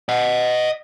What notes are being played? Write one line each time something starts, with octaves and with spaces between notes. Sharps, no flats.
D#5 F#5